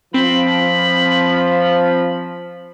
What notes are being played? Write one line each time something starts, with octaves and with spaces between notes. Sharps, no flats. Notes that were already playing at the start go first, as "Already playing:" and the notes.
F3 C4 B5